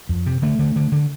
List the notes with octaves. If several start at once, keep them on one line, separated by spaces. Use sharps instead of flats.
F2
C3
D3 A3
D3
D3
D3